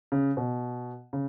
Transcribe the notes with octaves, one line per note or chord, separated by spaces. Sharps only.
C#3
B2
C#3